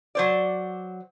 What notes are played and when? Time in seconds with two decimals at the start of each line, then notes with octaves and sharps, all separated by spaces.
0.15 F#3 C5 D5